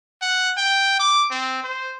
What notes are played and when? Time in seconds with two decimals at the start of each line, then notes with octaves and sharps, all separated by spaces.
0.22 F#5
0.58 G5
0.99 D6
1.31 C4
1.63 C5